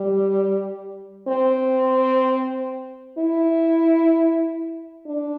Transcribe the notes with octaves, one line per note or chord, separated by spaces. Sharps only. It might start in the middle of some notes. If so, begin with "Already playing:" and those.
Already playing: G3
C4
E4
D4